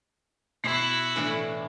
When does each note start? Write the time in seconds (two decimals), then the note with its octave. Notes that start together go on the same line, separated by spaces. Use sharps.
0.64 B2 E4 F#4 C7
1.16 A2 E3 D4